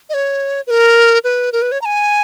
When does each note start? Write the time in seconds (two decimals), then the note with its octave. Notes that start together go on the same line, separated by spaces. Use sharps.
0.10 D#5
0.14 C#5
0.67 B4
0.70 A#4
1.24 B4
1.53 A#4
1.62 B4
1.72 C#5
1.82 A#5
1.85 G#5